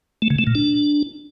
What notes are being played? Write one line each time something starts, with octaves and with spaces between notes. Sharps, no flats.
A3
C#3
A3
A#2
D4